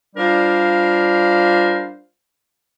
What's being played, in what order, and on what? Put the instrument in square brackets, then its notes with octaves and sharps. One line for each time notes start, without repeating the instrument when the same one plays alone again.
[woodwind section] G3 D4 F4 A#4 C5 F5